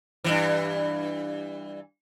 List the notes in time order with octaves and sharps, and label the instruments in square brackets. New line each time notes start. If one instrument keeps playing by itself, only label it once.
[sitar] G2 A#2 E3